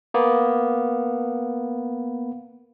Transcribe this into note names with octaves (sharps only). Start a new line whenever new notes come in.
A#3 B3